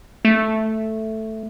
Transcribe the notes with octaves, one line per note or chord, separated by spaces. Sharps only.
A3